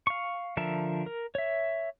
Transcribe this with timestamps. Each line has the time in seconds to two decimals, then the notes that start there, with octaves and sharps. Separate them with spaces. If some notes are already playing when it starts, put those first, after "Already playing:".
0.07 F5 C#6
0.57 D3 F3 A#4 E5 A5
1.06 A#4
1.35 C#5 E5